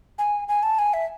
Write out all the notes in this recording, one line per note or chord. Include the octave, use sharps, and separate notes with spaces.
G#5
G#5
A5
G#5
E5